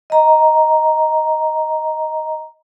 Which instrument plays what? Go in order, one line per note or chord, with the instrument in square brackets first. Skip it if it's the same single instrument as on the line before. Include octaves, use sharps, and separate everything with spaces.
[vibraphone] D#5 A#5